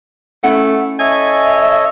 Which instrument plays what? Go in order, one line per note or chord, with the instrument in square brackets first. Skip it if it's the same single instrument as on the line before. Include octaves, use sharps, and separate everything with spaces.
[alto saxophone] A3 [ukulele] C#4 E4 F#5
[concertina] A4 C#5 D#5 [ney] E5 [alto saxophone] G#5